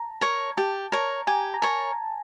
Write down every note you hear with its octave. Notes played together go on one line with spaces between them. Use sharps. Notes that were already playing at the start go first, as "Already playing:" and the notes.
Already playing: A5 A#5
A#4 C#5
G4 A5
A#4 C#5 A#5
G4 G#5
A#5
A#4 C#5 A5